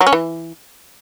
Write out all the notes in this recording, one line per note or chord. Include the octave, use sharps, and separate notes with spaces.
F#3
C#4
E3